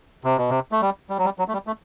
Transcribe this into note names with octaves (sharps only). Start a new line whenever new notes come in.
C3
B2
C3
A3
G3
G3
F#3
G3
F#3
A3
G3
A3